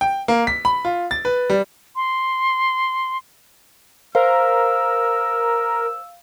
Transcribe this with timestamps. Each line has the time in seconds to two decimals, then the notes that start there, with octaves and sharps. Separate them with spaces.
0.01 G5
0.28 A#3
0.47 B6
0.65 B5
0.85 F4
1.11 A6
1.25 B4
1.50 G3
1.96 C6
4.15 A#4 C5 F5 E6